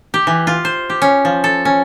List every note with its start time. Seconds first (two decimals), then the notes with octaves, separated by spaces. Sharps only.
0.14 G4
0.27 E3
0.47 F4
0.65 C5
0.90 G4
1.02 C#4
1.25 F3
1.44 A4
1.65 C#4